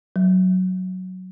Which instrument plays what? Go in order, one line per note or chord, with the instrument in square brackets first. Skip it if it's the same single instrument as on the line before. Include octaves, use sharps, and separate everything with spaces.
[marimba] F#3